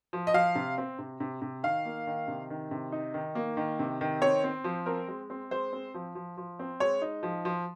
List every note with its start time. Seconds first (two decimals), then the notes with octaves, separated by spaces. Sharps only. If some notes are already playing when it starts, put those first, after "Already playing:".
0.13 F3
0.27 D#5
0.34 F3 F5
0.55 C3
0.78 C4
0.99 C3
1.20 C3
1.42 C3
1.63 D#3 F5
1.85 A#3
2.07 D#3
2.28 C3
2.50 D#3
2.71 C3
2.92 D#4
3.14 D#3
3.35 A#3
3.57 D#3
3.79 C3
4.01 D#3
4.21 C4 C#5
4.44 C4
4.64 F3
4.86 C4 A#4
5.08 G#3
5.30 C4
5.51 G#3 C5
5.73 C4
5.94 F3
6.15 F3
6.37 F3
6.59 C4
6.80 G#3 C#5
7.02 D#4
7.23 F3
7.45 F3